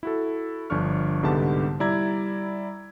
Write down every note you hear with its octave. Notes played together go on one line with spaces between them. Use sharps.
E4 F#4 A4
G1 F3 D4 C#6 F6
C2 G#2 D3 B3 G4 A5
G3 E4 D5 A#5 E6 G#6